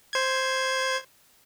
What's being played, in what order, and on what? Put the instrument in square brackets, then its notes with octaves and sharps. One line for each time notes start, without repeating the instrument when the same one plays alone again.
[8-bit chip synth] C5 G#6